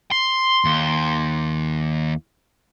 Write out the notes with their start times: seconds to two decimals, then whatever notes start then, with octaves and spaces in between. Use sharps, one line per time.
0.11 C6
0.65 D#2